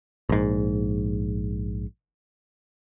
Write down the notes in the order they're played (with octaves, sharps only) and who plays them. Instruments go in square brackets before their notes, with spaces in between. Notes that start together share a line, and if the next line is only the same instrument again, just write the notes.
[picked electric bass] A#1 G#2